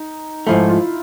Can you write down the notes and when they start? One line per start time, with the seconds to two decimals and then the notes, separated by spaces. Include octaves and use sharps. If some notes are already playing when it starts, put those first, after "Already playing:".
Already playing: D#4
0.47 G#2 F3 A3 E4
0.69 F4